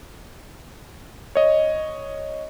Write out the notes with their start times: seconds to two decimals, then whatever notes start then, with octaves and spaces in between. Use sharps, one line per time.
1.35 C#5 D#5